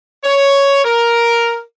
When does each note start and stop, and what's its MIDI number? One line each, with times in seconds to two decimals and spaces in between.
0.23 0.83 73
0.84 1.60 70